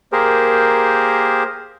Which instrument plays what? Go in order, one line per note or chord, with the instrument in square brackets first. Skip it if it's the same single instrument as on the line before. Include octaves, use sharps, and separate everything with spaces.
[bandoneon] A#3 G4 G#4 A#4 C5